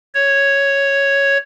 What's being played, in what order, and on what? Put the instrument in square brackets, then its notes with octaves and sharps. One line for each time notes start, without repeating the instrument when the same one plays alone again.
[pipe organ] C#5